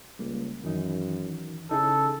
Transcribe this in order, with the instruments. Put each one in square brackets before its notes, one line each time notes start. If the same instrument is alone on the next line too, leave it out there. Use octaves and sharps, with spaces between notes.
[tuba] C#2 [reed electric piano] G3 A#3
[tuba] F#2 [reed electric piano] D#3 E3 D#4
[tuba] C#3 [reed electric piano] D#4 E4 G#4 [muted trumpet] A4